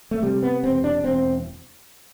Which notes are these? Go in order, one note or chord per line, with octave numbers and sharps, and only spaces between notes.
A3
C3 G3
B3
E1 C4
D4
E1 C4